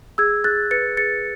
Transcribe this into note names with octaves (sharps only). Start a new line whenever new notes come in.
G#4 E6 G#6
G#4 F#6 A6
B4 A6 C#7
G#4 A6 C#7